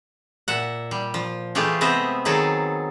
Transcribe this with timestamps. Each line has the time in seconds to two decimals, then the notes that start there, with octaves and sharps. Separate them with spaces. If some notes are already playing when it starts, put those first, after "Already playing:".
0.48 A#2 E5 F#5
0.91 G3
1.14 F3
1.55 E3 G#3 A3 F4 G4 G#4
1.81 C3 B3 C4 D#5 E5
2.25 D#3 F#3 G#4 A4